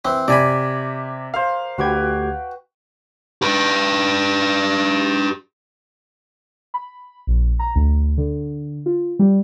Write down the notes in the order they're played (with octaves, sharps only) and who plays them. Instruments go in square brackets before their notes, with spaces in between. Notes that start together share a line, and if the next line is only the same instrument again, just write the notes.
[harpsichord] E3 C4
[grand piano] C3 [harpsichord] D5 G#5 B5
[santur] A#4 C5 [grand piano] F5
[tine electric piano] D2 G4 G#6 [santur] F#4 B4 G5
[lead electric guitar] G4 B4
[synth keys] B5
A#1
A#5
D2
D3
F4
G3